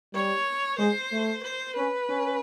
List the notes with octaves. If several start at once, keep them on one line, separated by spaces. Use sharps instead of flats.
G3 C#5
G#3 C5
A3
C5
C#4 B4
C#4